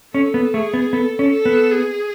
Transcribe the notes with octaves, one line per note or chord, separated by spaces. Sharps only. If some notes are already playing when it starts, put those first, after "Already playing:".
C#4 A4
B3
A3 G#4
B3
B3 A4
C#4
A4
B3
G#4